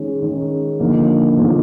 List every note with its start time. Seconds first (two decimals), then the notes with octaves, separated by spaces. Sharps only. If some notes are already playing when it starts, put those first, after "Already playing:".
Already playing: D#3 G#3 C#4
0.22 D#3 G#3 C#4
0.80 D3 F3 A#3 D#4
1.37 D3 F3 A#3 D#4